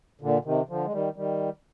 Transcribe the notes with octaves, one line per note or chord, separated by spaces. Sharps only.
A#2 D3
C3 D#3
D3 F3
G#3
D#3 G3
D#3 G3